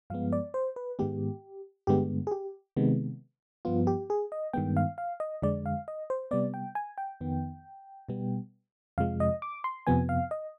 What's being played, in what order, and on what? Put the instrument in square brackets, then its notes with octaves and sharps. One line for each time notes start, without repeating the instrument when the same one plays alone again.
[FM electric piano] G2 F3 G#3 B3 F5
D5
C5
B4
G#2 D#3 G#3 B3 G4
G2 D3 G#3 B3 G4
G#4
G4
C3 D#3 G#3 B3
G2 F3 B3 F4
G4
G#4
D#5
G2 D#3 G#3 B3 G5
F5
F5
D#5
F2 D3 G#3 D5
F5
D#5
C5
C3 G3 B3 D5
G5
G#5
G5
F2 D#3 B3
B2 G3 B3
F2 C3 F3 G#3 F5
D#5
D6
C6
F2 C3 F3 B3 G#5
F5
D#5